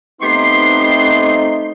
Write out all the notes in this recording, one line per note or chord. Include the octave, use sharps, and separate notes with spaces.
A3 B3 C4 D#4 G4 C6 C7